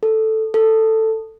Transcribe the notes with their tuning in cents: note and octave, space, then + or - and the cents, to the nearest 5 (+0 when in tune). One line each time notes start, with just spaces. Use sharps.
A4 +0
A4 +10